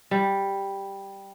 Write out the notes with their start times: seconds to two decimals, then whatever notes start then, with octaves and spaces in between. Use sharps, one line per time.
0.11 G3